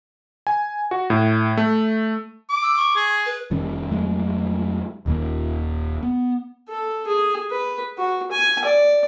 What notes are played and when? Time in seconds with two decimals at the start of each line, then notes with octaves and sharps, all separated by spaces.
0.47 G#5
0.91 F#4
1.10 A2
1.57 A3
2.50 D6
2.63 E6
2.77 C#6
2.96 G#4
3.26 B4
3.51 F1 D#3 G3 C#4
3.91 F2 F#3 G#3 A3
5.06 D#1 D#2 D#3 A#3
6.03 B3
6.69 A4
7.07 G#4
7.51 B4
7.98 F#4
8.32 G#5
8.65 D5